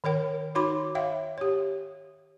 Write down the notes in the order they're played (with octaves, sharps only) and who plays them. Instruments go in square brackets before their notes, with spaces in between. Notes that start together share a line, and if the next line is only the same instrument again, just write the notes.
[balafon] D#3 A#4 C#5 G5
D#4 F#4 C#5 B5 C6 D6
C#5 E5 F5 G5
G4 C#5